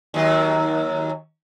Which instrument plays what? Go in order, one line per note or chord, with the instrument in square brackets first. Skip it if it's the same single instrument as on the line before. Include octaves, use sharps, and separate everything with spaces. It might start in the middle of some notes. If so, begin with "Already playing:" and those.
[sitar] D#2 F#3